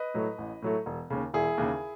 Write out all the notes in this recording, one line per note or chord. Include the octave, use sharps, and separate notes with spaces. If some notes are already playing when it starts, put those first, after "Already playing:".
Already playing: B4 D#5
A2 F#3 A3
A1
A2 F#3 A3
E1
D#2 C#3
E1 E4 G#4
D#2 C#3